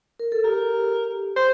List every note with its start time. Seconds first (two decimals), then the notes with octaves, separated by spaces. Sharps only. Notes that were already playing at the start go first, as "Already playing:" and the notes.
0.19 A#4
0.32 A4
0.44 G4 A#4
1.36 C5